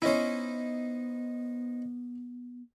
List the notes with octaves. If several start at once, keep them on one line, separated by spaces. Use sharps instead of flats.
B3 C#4 D#4 E4 C5